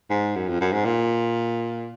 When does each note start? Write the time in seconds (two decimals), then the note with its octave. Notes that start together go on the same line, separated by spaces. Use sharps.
0.10 G#2
0.36 F#2
0.49 F2
0.61 F#2
0.73 G#2
0.85 A#2